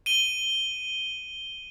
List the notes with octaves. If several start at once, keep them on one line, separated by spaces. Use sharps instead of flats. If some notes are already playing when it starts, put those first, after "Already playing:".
D#7 G7